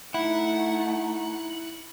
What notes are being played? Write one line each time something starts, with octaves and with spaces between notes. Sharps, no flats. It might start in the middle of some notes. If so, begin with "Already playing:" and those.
A3 D#4 E4 F#5